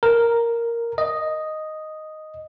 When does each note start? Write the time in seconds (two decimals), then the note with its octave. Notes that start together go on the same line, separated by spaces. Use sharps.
0.03 A#4
0.98 D#5